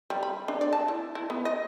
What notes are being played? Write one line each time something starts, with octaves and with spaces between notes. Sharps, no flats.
G3
B5
D4
D5
A5
E4
E4
B3
D#5